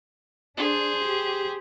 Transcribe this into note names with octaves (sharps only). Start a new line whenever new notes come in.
D4 G#4 C5
G4